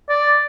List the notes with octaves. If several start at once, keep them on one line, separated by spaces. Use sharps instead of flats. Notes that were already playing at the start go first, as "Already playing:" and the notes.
D5